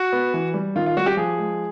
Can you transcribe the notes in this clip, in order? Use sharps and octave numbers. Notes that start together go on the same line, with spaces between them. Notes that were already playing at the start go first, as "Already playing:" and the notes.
Already playing: F#4
B3
E3
G3
D#3 F4
F4
G3 F#4
G4
F3 G#4
G#3